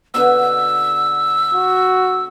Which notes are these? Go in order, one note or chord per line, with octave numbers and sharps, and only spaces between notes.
B2 D3 E6
F#4